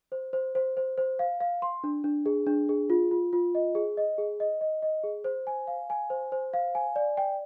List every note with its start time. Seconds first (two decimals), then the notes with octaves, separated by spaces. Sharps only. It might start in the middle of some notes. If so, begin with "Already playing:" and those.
0.12 C5
0.33 C5
0.55 C5
0.77 C5
0.98 C5
1.19 F5
1.40 F5
1.62 C6
1.84 D4
2.04 D4
2.26 G#4
2.47 D4
2.69 G#4
2.90 F4
3.11 F4
3.33 F4
3.55 D#5
3.75 G#4
3.97 D#5
4.18 G#4
4.40 D#5
4.61 D#5
4.82 D#5
5.04 G#4
5.24 C5
5.47 G#5
5.67 F5
5.90 G#5
6.10 C5
6.32 C5
6.53 F5
6.75 G#5
6.96 D5
7.17 G5